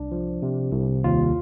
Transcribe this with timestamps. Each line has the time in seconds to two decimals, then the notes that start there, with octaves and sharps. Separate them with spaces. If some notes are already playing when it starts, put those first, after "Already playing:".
Already playing: C2 D4
0.11 F3
0.42 C3
0.73 C2
1.04 D#2 F4